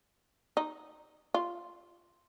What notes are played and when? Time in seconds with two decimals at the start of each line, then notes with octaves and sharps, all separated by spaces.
0.57 D#4
1.34 F4